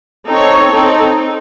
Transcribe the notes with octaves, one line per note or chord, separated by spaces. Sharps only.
C4 D#4 A4 C#5
C4 D#4 A4